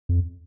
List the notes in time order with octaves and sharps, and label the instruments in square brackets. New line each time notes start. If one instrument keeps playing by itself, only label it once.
[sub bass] F2